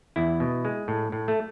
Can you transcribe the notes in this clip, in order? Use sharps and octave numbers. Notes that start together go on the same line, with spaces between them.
E2 E4
B2
G#3
A2
A2
A3